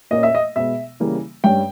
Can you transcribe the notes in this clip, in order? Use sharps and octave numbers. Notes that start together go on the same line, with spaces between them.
A#2 A#3 C#4 D#5
E5
D#5
B2 G#3 B3 E5
C#3 E3 G3 A#3
G2 G3 C#4 G5